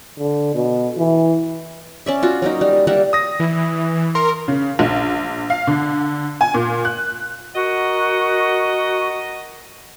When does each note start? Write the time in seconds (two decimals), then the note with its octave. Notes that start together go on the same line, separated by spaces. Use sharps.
0.19 D3
0.54 B2
0.98 E3
2.06 C#4 D5 E5
2.23 F4 F#4
2.42 F#3 A#3 D#4
2.61 G3
2.87 G3 A#3 E5 F#5
3.13 D#6 A#6
3.40 E3
4.15 A#4 C6
4.48 C#3
4.79 A#1
5.50 F5
5.67 D3
6.41 G#5
6.54 A#2
6.85 F#6
7.55 F#4 A#4 D#5 F#5